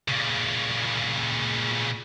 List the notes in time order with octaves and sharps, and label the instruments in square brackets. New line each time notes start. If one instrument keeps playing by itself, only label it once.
[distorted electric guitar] A#2 C#3